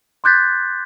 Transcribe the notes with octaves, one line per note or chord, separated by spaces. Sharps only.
C6 D6 F#6 G6 A6 B6